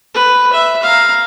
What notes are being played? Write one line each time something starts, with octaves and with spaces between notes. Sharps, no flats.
B4
E5
F5 A#5